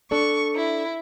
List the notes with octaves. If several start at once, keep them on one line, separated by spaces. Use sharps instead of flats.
D4 A4 D5 C#6
E4